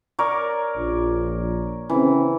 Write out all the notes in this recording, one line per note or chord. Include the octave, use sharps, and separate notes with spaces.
A#4 C#5 D5
A#1
C#3 E3 C4